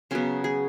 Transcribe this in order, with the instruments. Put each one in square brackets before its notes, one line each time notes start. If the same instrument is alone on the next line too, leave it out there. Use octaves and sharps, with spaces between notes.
[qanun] C#3 F#3 B3 C#4
G#4